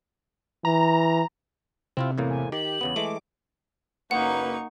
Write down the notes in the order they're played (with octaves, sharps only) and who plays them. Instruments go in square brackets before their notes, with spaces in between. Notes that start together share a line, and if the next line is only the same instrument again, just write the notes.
[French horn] E3 [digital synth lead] A#5
[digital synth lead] C3 [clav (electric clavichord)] C4 E4 F4
[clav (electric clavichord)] E2 A2 A#3
[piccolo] G#5
[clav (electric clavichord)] D#3 [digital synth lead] G4 [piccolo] F#7
[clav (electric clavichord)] E2 C#3 B3
[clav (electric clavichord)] E3 G#3 A3 [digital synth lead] D6
[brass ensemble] F#1 F#2 B4 [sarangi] A#3 [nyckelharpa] D#4 C#6 [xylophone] F#5